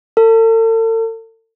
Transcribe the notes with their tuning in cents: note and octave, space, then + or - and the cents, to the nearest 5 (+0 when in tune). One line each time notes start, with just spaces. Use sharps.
A4 +40